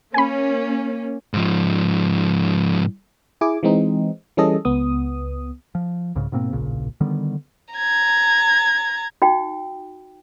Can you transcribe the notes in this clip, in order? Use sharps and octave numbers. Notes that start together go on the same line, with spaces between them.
A#3 C#4 G#5 B5
G#2 F3
E4 G#4 G#5 D6
E3 G#3 C4 D#4
E3 G3 C#4 G#4 A4 D#5
C#2 B3 D#6
F3
C2 G#2 C#3
G#2 B2 A#3 C4
D1 A#1 A#2 C#3
D3 D#3 G3 B3
A#5 G#6
D#4 F#4 G5